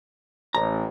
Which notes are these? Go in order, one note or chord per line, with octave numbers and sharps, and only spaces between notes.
A1 A2 A#5